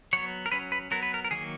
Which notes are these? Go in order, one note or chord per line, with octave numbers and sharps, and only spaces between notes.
F#3 B3 C#5
A#4
F#3 C#4 B4
B4
F#3 B3 A#4
B4
A#4
A#4
D#3 F#3 A#3 G#4